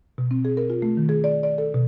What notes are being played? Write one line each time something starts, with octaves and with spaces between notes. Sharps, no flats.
B2
C4
G#4
A#4
F4
A3
D#3
G#4
D5
D5
A4
B2